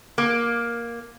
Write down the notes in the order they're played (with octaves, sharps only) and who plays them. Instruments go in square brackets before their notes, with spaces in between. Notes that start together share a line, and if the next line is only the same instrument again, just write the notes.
[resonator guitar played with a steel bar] A#3